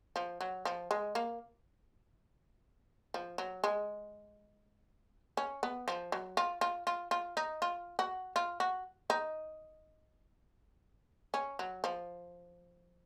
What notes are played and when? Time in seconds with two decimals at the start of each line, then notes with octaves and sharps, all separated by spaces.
0.16 F3
0.41 F#3
0.65 F3
0.91 G#3
1.15 A#3
3.14 F3
3.38 F#3
3.64 G#3
5.37 C#4
5.63 B3
5.88 F3
6.12 F#3
6.37 F4
6.61 F4
6.87 F4
7.11 F4
7.37 D#4
7.62 F4
7.99 F#4
8.36 F4
8.60 F#4
9.10 D#4
11.34 C#4
11.59 F#3
11.84 F3